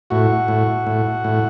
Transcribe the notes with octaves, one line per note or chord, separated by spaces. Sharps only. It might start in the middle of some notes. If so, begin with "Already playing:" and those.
A2 F#4
A2
A2
A2